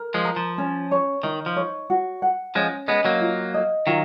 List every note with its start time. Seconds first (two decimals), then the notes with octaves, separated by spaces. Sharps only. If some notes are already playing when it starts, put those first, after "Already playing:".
Already playing: A#4
0.14 F3 G#3
0.25 A#5
0.36 F3
0.58 C#4
0.91 C#5
1.23 D#3 D#4
1.46 F3
1.56 C#5
1.90 F#4
2.22 F#5
2.55 F3 G#3 C#4
2.88 G#3 B3 D#5
3.05 F#3 A#3
3.21 F4
3.54 D#5
3.87 D#3 F#3 F4